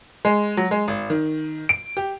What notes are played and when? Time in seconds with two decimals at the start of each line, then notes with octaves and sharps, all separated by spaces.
0.25 G#3
0.57 F#3
0.71 G#3
0.88 G#1
1.10 D#3
1.69 D7
1.97 G4